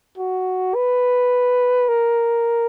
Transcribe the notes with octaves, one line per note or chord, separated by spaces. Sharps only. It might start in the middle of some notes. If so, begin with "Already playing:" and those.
F#4
B4
A#4